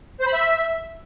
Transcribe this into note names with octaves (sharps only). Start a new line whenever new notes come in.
C5
B5
E5